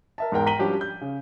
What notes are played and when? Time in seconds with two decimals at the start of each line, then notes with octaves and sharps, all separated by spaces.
0.18 A#4 E5 A5
0.32 E2 G#2 A#4 G5
0.46 G5 A#5 B6 D#7 F#7 G7
0.59 F3 G3 C#4 D4 F#4 G4
0.81 G6
1.01 C#3